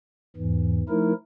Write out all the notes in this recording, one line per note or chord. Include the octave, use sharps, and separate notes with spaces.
E2 G#2 E3
F3 A3 D#4 E4 A#4